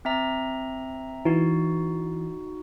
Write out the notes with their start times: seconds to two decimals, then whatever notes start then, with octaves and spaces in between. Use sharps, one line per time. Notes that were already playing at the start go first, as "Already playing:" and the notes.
0.05 C4 E5 A#5
1.25 E3 D#4 F#4